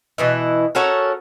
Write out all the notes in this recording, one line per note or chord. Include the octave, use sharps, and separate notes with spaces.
B2 E3 E4
C#4 F#4 A4 A#4